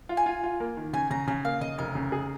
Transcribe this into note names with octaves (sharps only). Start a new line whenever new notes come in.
F4
G#5
F4
F4
A#3
D#3
C#3 G#5
C#3 A#5
C#3 G#5
A#3 F5
C#3 D#5
F1 A#4
C#3
G#4